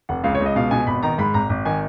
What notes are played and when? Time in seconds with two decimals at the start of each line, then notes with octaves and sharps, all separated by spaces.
0.09 F1 F#5
0.24 C#2 F5
0.35 C#5
0.40 C#2
0.46 D#5
0.56 B2 F5
0.71 B2 G#5
0.87 G#1 B5
1.03 D#3 A#5
1.18 G#2 B5
1.34 G#1 A#5
1.50 G#1
1.65 D#3 G#5